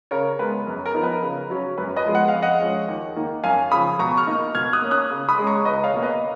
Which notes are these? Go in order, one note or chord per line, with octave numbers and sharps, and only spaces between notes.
C#3 A#4 C#5
G#3 B3 B4
F#2
A#4
F3 B3 D#4
B4
C#3
F#3 C#4
F#2 B4
B4 D#5
F3 G#3 B3
F#5
F5
F2
D#5 F#5
F3 G#3 C#4
D#2
D#3 A#3 D#4
F#2 F5 G#5
C#3 F3 B5 D#6
B2 A#5 C#6
C#6 F6
A#3 D#4
B2 F6 G#6
D#6 F#6
A#3 C#4
D#6 F#6
C#3
B5 D#6
G#3 C#4
A#5 C#6
C#2 B4 D#5
C#5 F5
B2 A#3
B4 D#5